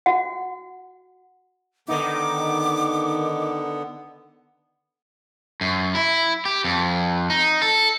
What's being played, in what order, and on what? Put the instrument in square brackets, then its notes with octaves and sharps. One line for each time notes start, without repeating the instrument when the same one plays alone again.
[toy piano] F#4 F#5
[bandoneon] D3 B3 [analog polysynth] D#3 D#4 [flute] D6
[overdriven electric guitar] F#2
E4
G4
F2
D#4
A4